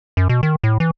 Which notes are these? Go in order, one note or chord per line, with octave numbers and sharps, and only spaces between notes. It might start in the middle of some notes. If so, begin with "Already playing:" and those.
F#2
B2
D#3
A2
E3